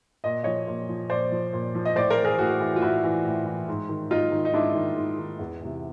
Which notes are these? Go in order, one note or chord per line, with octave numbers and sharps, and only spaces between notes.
A#2 D#5
F3 C#5 D#5
A#2
F3
A#2 C5 D5
F3
A#2
F3
D#5
A2 C5 D5
A#4 C5
E3
G#4 A#4
A2 F#4 G#4
E3
F4
A2 E4 F#4
E3
A2
E3
G#2
D#3
G#2 D#4 F4
D#3
D#4
G#2 D4 E4
D#3
G#2
D#3
E2
C3 E3